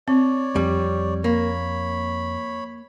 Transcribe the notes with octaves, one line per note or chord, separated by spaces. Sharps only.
C4 C#5 D5
F2 G3
A#3 C#5 B5